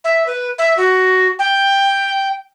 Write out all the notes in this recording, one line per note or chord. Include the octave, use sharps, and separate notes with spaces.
E5
B4
E5
F#4
G5